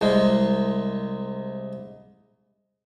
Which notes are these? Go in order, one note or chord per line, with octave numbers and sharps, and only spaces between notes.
C2 G#3